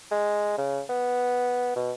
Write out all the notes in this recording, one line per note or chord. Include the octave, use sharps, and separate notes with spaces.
G#3
C#3
B3
B2